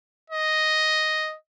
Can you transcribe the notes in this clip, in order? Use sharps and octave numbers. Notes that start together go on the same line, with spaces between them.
D#5